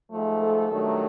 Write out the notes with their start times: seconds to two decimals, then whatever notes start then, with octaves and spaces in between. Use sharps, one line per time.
0.12 G#2 F3 A3
0.41 A4
0.70 G2 D#3 F#3 A3